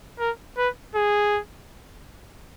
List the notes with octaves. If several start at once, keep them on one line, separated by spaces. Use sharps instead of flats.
A#4
B4
G#4